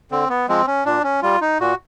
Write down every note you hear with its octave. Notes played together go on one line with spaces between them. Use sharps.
D3 C4
B3
F3 G#3 C4
C#4
A#2 D4
C#4
G3 F4
D#4
A#2 F#4